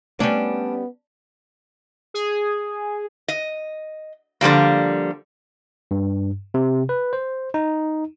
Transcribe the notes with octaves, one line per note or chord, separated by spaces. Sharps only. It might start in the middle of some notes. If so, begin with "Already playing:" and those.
G3 A3 B3 C#4 D4
G#4
D#5
D3 F3 G3 A#3
G2
C3
B4
C5
D#4